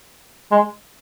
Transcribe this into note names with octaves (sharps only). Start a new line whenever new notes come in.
G#3